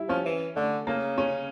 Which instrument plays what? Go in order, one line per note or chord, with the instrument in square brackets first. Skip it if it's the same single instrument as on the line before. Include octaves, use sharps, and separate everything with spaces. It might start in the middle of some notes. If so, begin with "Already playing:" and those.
Already playing: [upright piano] G3 E4
[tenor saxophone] F3 [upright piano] C#4
[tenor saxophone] E3
[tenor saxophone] D3 [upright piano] A3
[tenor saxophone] C#3 [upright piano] A#3
[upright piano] C#4